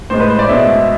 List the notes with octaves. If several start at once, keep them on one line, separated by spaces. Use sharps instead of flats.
A2 G#3 C5
B4
C5
D5
B2 G#3 E5